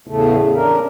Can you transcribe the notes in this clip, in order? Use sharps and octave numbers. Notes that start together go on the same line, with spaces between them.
E2 A2 C#3 A3
C#4 D4 A#4